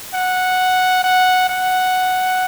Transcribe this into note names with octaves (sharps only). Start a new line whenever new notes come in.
F#5
F#5
F#5